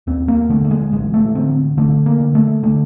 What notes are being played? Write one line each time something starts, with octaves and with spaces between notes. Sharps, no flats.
D#2 C4
A#3
D3 A3
A3
G#3
A1 G#3
A3
D3 C4
D3 A3
A#3
D3
A3
D3 A3